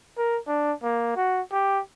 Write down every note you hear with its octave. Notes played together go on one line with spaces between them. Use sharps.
A#4
D4
A#3
F#4
G4